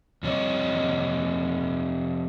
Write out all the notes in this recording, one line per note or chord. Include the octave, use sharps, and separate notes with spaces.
F2 C3 C#4 C#5 D#5